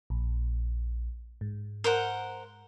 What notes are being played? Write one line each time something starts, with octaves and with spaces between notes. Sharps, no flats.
A#1
G#2
A#4 C5 F#5